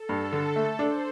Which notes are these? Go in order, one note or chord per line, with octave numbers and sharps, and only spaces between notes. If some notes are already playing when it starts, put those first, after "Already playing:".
Already playing: A4
G2
D3
A3
D4 C5